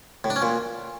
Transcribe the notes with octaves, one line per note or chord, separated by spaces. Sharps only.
A2
D4
C#4
A#2